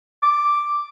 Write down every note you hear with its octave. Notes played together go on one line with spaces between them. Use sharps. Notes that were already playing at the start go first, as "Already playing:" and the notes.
D6